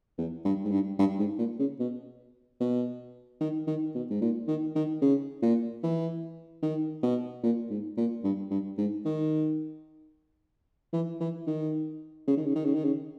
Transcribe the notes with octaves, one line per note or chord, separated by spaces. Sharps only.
E2
G2
G#2
G2
G2
G#2
A#2
C#3
B2
B2
D#3
D#3
B2
G#2
A#2
D#3
D#3
C#3
A#2
E3
D#3
B2
A#2
G#2
A#2
G2
G2
G#2
D#3
E3
E3
D#3
C#3
D#3
C#3
D#3
C#3
D#3
C#3